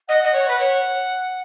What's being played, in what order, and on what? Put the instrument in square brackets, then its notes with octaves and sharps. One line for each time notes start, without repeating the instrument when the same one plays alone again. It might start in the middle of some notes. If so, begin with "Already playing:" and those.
[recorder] D#5 [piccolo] F#5
[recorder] D#5
C#5
B4
C#5